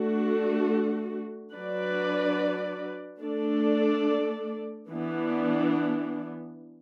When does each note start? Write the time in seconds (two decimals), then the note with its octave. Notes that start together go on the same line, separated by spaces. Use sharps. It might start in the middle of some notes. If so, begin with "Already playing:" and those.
Already playing: A3 D4 F#4
1.52 F#3 D4 B4 D5
3.20 A3 D4 A4 D5
4.89 E3 B3 D4